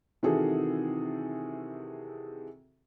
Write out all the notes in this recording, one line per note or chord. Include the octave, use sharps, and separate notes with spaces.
C3 D#3 E3 F#4 G#4 A4